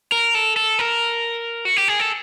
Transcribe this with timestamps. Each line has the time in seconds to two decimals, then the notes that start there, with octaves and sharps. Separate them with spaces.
0.12 A#4
0.35 A4
0.56 A4
0.79 A#4
1.65 F#4
1.76 G4
1.88 G#4
2.00 A4